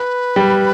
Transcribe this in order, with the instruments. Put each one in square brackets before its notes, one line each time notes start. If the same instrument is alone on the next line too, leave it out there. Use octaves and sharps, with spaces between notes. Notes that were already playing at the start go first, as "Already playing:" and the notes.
Already playing: [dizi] B4
[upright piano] G3